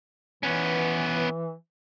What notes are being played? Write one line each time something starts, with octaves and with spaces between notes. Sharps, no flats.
E3 B3 C#4